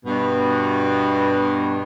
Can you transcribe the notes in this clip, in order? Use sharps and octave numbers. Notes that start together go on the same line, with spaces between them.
G2 B2